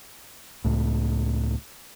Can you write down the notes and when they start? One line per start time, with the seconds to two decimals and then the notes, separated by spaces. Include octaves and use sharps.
0.65 C#2 A2